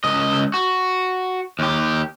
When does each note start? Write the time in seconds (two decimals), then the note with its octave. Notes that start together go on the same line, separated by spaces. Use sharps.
0.04 C#2 D#5
0.54 F#4
1.59 D#2 G4